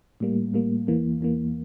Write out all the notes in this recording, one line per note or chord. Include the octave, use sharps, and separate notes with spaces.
A2 G3 A#3
A2 G3 A#3
E2 E3 A#3
E2 E3 A#3